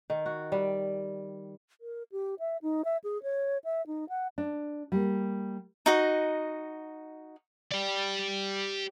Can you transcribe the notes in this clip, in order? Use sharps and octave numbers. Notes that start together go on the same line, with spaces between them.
D#3
F#4
G3
A#4
G4
E5
D#4
E5
G#4
C#5
E5
D#4
F#5
D4
G3 A#3
D#4 F#4 D#5
G4 D5